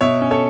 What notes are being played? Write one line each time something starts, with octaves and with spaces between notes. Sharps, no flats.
B2 C#5 E5
C#4
A4 C#5